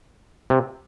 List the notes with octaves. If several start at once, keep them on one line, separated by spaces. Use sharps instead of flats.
C3